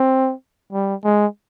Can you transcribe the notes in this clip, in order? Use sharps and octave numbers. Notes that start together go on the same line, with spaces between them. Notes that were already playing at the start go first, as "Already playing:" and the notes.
Already playing: C4
G3
G#3